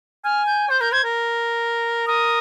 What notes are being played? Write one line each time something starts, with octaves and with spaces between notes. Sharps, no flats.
G#5 F6
G6
C5 G6
A#4 G6
C5 G#6
A#4
A#4 D#6